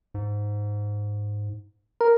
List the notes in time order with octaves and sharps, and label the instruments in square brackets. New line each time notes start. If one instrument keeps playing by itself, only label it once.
[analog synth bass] G#2
[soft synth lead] A#4